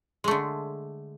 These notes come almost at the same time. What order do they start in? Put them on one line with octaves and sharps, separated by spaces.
G#3 A3 D3